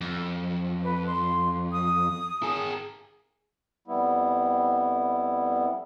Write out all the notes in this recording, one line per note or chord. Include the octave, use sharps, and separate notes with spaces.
F2
B4
C6
D#6
G#4 A#4
F2 G3 B3 E4